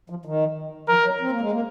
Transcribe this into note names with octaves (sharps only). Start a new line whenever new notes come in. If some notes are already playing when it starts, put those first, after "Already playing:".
F3
D#3
F3 A#4
F#3
C4
A#3
G#3
A#3